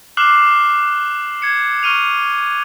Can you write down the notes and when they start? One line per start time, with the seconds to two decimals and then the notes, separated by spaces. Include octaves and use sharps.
0.17 D6 F6 F#6 C7 E7 F#7
1.42 G#6 C#7
1.83 C#6 F6 D#7 F7